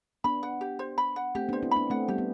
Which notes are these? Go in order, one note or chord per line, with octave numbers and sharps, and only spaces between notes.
B3 D4 B5
F#5
G4
C5
B5
F#5
A3 C4 G4
B3 D4 C5
C4 E4
B3 D4 B5
A3 C4 F#5
G3 B3 G4
B3